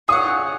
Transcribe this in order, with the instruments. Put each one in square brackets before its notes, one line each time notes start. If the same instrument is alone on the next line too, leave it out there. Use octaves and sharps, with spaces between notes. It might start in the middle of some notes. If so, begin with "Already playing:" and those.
[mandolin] G#4 C#5 F#5 [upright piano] D#6